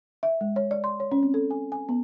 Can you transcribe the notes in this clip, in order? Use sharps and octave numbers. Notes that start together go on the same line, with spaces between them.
E5
G#3
C#5
D5
C6
C#5
C#4
C4
A4
G#5
G#5
B3